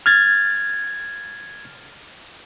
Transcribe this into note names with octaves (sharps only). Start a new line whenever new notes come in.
F6 G#6 A6